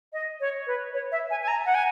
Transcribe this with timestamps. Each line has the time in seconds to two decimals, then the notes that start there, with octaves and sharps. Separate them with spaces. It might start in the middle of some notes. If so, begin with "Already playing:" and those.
0.12 D#5
0.40 C#5
0.66 B4
0.93 C#5
1.11 E5
1.30 G#5
1.42 G#5
1.47 A#5
1.65 F#5
1.74 G#5